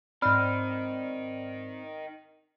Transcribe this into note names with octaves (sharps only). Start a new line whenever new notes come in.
G#2 D#3 C4 D#4 D5 B5 F6